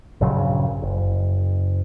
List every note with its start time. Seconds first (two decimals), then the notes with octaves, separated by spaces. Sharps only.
0.21 A#1 G2 C#3 F#3
0.82 F#1